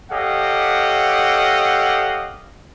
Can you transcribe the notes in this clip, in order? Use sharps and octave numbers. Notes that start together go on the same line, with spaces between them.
G4 A4 C#5 D#5 F5 F#5